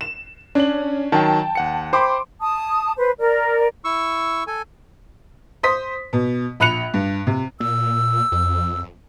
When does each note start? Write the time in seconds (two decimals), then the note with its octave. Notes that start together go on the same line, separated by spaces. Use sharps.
0.01 E7
0.55 C#4 D4 F#7
1.12 D#3 F#3 G5 A5
1.55 D#2 F#5 C#7
1.93 C5 G5 B5 C6 D6
2.40 A5 D#6
2.97 B4 C5
3.18 A#4 D5
3.85 E4 C#6 E6
4.47 A4 G#5
5.63 C5 C6 D#6 B6
6.13 B2
6.60 A#1 B5 F#6 C#7 F7
6.94 G2
7.27 C3
7.60 A#2 E6
8.32 F2